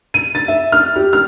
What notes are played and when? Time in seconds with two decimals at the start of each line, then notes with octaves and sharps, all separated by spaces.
0.14 D#7
0.35 A6
0.48 E5
0.72 F6
0.95 G4
1.13 F6